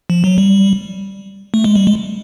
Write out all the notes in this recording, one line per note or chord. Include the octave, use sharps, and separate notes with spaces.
F3
F#3
G3
A3
G#3
G3
G#3